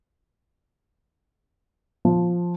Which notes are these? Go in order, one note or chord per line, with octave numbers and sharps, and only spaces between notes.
F3